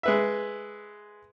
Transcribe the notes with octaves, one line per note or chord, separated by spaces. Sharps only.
G#3 B4 E5